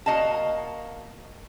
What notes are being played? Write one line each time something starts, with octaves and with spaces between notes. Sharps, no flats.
A#3 F#4 D#5 F5 A5